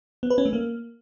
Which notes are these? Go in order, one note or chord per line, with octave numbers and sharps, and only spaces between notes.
B3
B4
C#4
A3
A#3